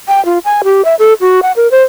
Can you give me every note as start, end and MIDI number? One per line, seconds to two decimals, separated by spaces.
0.08 0.23 79
0.25 0.39 65
0.45 0.62 80
0.64 0.84 67
0.85 0.95 76
0.99 1.13 69
1.21 1.40 66
1.42 1.52 78
1.56 1.70 70
1.71 1.83 72